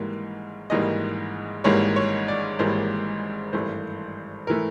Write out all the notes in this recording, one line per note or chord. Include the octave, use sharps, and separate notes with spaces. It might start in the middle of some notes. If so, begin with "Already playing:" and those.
Already playing: G#1 G#2 E3 G3 A#3
G#1 G#2 E3 G3 A#3 D#5
G#1 G#2 E3 G3 A#3 C#5
C#5
D5
G#1 G#2 E3 G3 A#3 C5
G#1 G2 E3 A3 C5
E3 A3 A#4